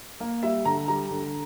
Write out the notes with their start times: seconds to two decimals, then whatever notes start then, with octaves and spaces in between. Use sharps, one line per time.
0.20 A#3
0.43 G3 E5
0.65 D3 A#5
0.88 G3 A#5
1.11 D3